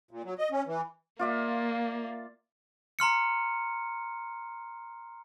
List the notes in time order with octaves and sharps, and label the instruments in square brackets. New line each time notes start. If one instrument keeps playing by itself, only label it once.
[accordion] A#2
F#3
D#5
C#4
E3
[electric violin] A#3 [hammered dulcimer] F4 D5 E5
[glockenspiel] A#5 C6 F6 C#7